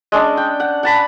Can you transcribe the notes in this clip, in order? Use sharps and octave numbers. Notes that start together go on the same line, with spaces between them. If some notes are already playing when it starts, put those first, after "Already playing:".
G#3 C#4 D4
G5
F#5
F#5 A5 B5